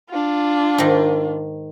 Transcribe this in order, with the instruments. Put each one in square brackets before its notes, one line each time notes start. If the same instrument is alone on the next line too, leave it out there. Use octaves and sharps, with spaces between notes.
[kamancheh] D4 F4
[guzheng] G#2 D#3